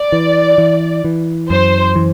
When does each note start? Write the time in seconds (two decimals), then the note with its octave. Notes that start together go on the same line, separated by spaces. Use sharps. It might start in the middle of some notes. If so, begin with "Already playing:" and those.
Already playing: D5
0.12 E3
0.58 E3
1.05 E3
1.50 F#2 C5
1.96 E3